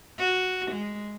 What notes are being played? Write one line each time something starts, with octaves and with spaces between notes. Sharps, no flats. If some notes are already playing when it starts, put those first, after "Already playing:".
F#4
G#3